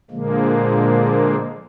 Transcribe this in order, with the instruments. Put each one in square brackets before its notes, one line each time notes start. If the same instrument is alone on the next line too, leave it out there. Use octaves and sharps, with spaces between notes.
[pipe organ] A#2 D3 F3 G#3 A#3